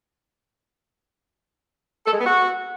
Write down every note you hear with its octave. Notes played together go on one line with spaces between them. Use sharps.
A4
G#3
B3
F#4